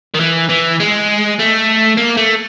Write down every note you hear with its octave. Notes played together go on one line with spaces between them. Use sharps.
D#3
E3
E3
G#3
A3
A#3
A3